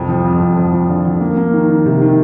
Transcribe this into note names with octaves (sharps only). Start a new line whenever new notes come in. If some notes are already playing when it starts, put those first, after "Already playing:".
Already playing: C2 F2
F3
F2
F2
F2
F3
D3
F3
A#3
A#3
D#3
D#3
C3
D#3